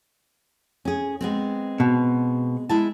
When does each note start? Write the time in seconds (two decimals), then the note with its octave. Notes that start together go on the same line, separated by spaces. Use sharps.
0.85 C#4 G#4
1.21 G#3 B3 C4
1.80 B2
2.69 G#3 E4 A5